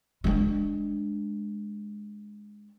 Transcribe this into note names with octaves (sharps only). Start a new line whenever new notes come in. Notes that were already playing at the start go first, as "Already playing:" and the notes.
G#3 D4